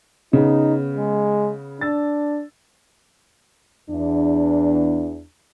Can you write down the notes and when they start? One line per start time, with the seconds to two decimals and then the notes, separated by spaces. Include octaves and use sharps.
0.33 C#3 B3 D#4
0.96 G#3
1.81 D4 E6 A6
3.90 E2 D4